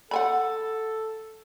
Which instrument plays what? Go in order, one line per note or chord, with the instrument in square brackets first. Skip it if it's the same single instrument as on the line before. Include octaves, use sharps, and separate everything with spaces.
[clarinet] A4 [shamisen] F#5 G#5 B5